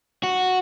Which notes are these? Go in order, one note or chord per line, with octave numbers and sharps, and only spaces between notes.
F#4